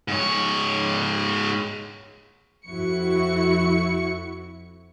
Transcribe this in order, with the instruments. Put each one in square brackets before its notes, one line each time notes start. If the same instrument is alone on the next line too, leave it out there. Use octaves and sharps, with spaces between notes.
[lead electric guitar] G#2 C#5
[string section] F2 E4 F#4 C#6 C#7